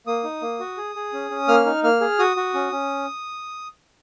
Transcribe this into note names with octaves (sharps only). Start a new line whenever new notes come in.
A#3 D#6
D#4
A#3
F#4
G#4
G#4
C#4
C#4
A#3 F6
D#4
A#3 F6
G#4
F#4 D#6
F#4
C#4
C#4